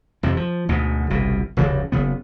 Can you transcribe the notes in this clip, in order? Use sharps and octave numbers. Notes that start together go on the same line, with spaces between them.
F2 C3 F3
F3
D2 G#2 B2
G1 C2 B2
F1 D2 G2 C#3
F#1 C#3 B3